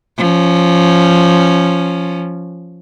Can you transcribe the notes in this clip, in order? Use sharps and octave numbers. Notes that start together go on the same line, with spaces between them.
F3 C#4